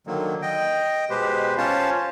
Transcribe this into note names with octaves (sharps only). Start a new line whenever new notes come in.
D3 D#3 F#3 A#3
D#5 G5
B2 G#3 G4 B4 C5
C#4 F4 C5 C#5 F5 A5